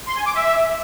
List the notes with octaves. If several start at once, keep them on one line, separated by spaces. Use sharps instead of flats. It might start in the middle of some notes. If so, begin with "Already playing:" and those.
C6
G#5
D6
E5